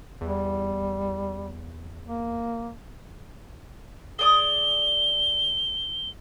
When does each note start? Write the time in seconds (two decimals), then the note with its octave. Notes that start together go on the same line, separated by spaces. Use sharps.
0.21 E2 G3
2.07 A#3
4.19 G#4 D5 D#6 G7